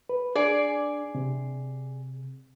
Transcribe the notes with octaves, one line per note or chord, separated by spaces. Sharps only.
B4
D4 G#4 D5
C3